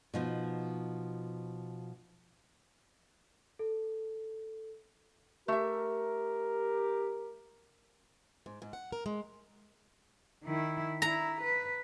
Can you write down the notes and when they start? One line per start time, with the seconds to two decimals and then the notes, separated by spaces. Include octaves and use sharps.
0.14 B2 F3 D#4
3.59 A4
5.48 A3 G4 A#4 E5
8.46 G#2
8.62 G#2
8.73 F#5
8.92 A#4
9.06 G#3
10.44 D#3 E4
11.02 E4 A#5
11.42 B4